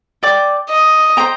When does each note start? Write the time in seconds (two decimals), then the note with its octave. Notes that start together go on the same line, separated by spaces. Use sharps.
0.23 D5 G5 D6
0.70 D#5
1.17 C5 G5 A#5